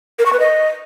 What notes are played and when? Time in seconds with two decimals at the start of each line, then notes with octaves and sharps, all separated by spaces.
0.19 A#4
0.26 C#6
0.33 B4
0.40 D#5